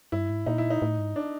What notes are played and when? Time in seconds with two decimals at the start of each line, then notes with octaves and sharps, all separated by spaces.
0.12 G2 E4
0.30 G#2
0.46 A#2 D#4
0.58 E4
0.70 D#4
0.82 A2
0.99 G#2
1.16 D4